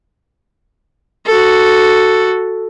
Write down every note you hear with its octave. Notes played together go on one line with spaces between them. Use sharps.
F#4 A4